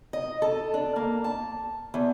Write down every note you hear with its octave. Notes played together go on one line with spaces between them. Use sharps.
D#5
A4
D4
A#3
A5
E2